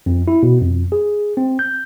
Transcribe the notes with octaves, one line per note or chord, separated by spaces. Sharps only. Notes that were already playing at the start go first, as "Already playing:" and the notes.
F2
E4
B2
F2
G#4
C4
G6